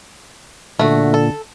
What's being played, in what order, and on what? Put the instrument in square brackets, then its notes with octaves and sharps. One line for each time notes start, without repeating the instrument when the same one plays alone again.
[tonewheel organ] A#2 [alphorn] D3 [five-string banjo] A3 F#4
[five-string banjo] A4